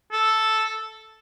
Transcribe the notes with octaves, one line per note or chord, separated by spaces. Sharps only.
A4